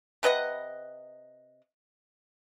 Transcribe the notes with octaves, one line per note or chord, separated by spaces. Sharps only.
C3 B4 D#5 F#5